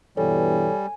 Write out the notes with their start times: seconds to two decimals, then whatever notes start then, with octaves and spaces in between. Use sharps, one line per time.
0.17 G2 B2 E3 G3 A4 C#5 G#5